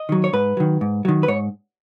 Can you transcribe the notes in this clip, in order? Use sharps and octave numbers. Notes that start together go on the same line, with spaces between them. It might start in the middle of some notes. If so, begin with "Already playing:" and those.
Already playing: D#5
D#3 F#3
C#5
G#2 B4
D#3 F#3
G#2
D#3 F#3
B4
G#2 C#5